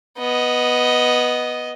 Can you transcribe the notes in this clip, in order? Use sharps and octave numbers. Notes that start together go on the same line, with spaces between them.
B3 D#5